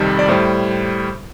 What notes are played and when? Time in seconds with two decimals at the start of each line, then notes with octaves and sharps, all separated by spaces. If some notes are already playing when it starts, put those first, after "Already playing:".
Already playing: F2 C3 D#3 G3
0.19 D5
0.28 A2 G3 C5